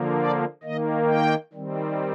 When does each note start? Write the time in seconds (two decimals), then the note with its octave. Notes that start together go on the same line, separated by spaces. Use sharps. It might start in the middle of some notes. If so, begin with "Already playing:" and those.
Already playing: D3 F3 A#3
0.18 D5
0.63 D#3 A#3 D#5
1.08 G5
1.53 D#3 G3 C4